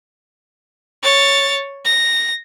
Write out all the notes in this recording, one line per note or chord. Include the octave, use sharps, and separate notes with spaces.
C#5 A6
A#6